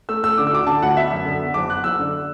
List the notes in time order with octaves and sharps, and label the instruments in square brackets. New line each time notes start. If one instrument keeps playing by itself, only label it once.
[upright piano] A3 E6
A3 E6
D3 D6
E6
D2 D6
D3 A5
D2 F#5
B3 E5
F#2
D3
B3
F#1 D6
B3 F#6
F#1 E6
D3